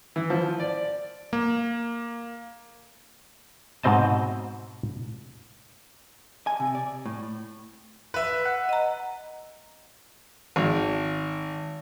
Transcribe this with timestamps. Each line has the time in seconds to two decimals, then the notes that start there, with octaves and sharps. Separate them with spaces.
0.16 E3
0.30 F3
0.59 D5
1.33 A#3
3.83 G#2 B2 C4 D#5 A5
6.47 G#5
6.60 C3
6.75 D5
7.06 A2
8.14 B4 E5
8.45 F#5
8.69 D#5 A#5
10.56 G#1